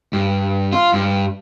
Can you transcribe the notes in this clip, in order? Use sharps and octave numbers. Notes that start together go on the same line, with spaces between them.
G2
F4
G2